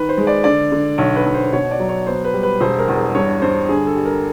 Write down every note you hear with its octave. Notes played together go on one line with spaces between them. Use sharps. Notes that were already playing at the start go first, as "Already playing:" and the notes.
Already playing: D#3 B4
C5
G#3
D5
D3 D5
D3
B1 C#5
B4
B1
C5
B2 C#5
D5
F#3
C#5
B3 C5
B4
G3
B4
E1 C5
A#4
E2
G2 C#5
G2 C5
D3 G#4
A4
G3
A#4